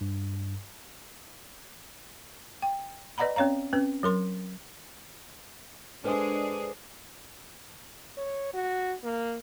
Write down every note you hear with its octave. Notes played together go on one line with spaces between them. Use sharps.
G2
G5
B4 D5 D#5 F#5 A#5 B5
C4 C#4 C#5 F5 A#5
C4 C#4 B4
F#3 A#4 C6
G#3 D4 G#4 A4 B4 C5
C#5
F#4
A#3